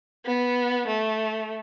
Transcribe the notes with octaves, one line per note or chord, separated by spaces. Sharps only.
B3
A3